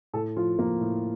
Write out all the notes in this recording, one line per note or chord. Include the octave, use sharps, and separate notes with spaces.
A2 A4
F3 F4
F3 A#3
A2